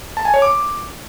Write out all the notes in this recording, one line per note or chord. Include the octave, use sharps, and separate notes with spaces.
A5
G#5
C#5
D6